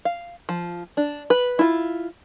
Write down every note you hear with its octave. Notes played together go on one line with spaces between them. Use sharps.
F5
F3
D4
B4
E4 F4